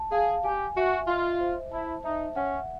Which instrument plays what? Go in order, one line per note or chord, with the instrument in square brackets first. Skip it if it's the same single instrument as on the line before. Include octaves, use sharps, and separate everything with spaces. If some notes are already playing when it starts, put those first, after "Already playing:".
Already playing: [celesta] A5
[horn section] G#4 [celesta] F5
[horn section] G4 [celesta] G#5
[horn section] F#4 [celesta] E5
[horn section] F4 [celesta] D#5
[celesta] C5
[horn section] E4 [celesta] A5
[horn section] D#4 [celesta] E5
[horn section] C#4 [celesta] F#5